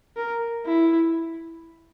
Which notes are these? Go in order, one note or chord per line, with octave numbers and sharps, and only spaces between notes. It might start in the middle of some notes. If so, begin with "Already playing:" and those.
A#4
E4